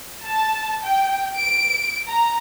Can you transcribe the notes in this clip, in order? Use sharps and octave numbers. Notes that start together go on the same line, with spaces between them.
A5
G5
D7
A#5